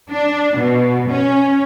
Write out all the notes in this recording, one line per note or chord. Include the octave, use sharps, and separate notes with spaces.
D4
B2
C#4